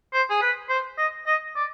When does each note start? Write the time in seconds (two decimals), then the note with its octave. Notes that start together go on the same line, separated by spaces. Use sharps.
0.13 C5
0.30 G#4
0.42 B4
0.69 C5
0.98 D#5
1.27 D#5
1.56 D5